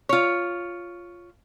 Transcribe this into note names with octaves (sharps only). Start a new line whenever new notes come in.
F4 C#5